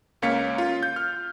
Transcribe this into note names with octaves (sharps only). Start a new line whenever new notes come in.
C#2 A#3 C#4 F5 B6 C#7
F4
G6
F6